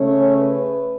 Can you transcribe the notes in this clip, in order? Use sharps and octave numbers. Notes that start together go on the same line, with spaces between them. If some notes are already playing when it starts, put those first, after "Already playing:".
Already playing: C#3 A3 C#4 C#5
B4